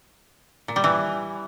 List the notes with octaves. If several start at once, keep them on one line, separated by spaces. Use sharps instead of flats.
A#2
G3
E3